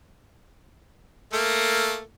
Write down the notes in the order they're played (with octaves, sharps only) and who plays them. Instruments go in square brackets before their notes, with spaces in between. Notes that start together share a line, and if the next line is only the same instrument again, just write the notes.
[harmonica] A3 A#3